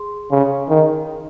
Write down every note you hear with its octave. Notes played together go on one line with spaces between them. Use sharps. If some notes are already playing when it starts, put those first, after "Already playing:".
Already playing: G#4 C6
C#3
D#3